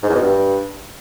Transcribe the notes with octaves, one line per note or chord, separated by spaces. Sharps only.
G#2
E2
B2
G2